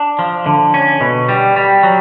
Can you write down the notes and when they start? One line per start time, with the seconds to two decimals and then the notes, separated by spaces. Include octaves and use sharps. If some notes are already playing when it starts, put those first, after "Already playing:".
Already playing: D4
0.19 F3
0.46 D3
0.74 C#4
1.01 B2
1.29 G3
1.56 G3
1.83 F#3